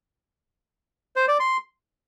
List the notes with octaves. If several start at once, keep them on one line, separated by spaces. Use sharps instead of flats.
C5
D5
C6